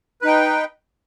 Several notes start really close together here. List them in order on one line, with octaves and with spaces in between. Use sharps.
B4 D#4 G5